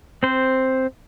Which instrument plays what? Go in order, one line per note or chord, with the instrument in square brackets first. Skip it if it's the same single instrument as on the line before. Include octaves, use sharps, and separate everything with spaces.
[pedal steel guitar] C4 C5